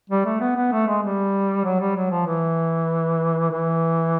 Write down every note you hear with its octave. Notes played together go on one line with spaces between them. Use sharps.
G3
A3
B3
B3
A3
G#3
G3
F#3
G3
F#3
F3
E3
E3